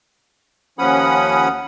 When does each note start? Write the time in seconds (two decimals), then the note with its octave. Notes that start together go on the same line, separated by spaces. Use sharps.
0.79 D#2 F3 C#4 F#5 B5 D#6